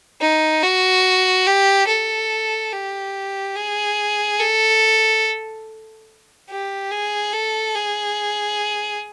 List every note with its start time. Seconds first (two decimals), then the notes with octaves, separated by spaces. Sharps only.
0.21 D#4
0.62 F#4
1.47 G4
1.88 A4
2.72 G4
3.55 G#4
4.40 A4
6.49 G4
6.91 G#4
7.33 A4
7.75 G#4